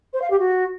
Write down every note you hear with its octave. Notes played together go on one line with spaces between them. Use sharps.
C5
F5
G4
F#4